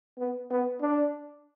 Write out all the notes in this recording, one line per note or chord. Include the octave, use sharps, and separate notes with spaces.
B3
B3
D4